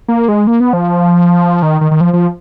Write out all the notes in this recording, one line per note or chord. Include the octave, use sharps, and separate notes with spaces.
A#3
G#3
A#3
B3
F3
D#3
D#3
D#3
F3
F3